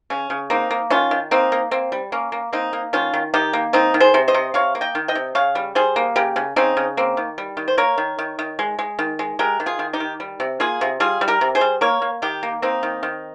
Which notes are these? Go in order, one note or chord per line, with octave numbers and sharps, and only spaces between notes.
C#3 C#4
C#3
A#3 C4 D#4
A#3
D#3 C#4 F4
D#3
A#3 C4 D#4
A#3
A#3 C4
G3
A#3 C#4
A#3
A#3 C4 D#4
A#3
D#3 C#4 F4
D#3
D#3 D#4 G4
A#3
D#3 C4 D#4
D#3
G#4 C5
C3
C5 D#5
C3
C3 C#5 F5
A#3
D#5 G5
D#3
D#5 G5
C3
C#3 C#5 F5
G3
G3 G#4 C5
A#3
C#3 G4 A#4
C#3
C#3 C4 D#4
C#3
A#3 C4
D#3
G3
D#3
C5
A#3 A#4 C#5
D#3
D#3
D#3
G#3
G#3
D#3
G#3
G#3 G4 A#4
D#3
F4 G#4
D#3
D#4 G4
D#3
G3
C3
A#3 F4 G#4
C3
G3 F4 G#4
G3
G4 A#4
C3
G#4 C5
G3
A#3 A#4 C#5
A#3
D#3 D#4 G4
A#3
A#3 C4 D#4
D#3
D#3